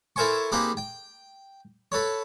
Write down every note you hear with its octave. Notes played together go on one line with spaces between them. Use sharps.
E4 A4 A#4 C5 G#5 C#6
A#3 C4 D#4 G4 G#4 B4
G5
A4 B4 C#5